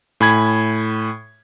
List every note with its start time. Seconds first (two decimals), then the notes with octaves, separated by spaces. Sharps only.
0.20 A2 G#5 B5 G#6